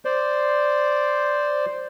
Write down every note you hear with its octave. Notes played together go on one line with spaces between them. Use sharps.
C5 D5